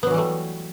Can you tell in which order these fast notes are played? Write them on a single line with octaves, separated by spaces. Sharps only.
B3 F#3 E3 G3 A3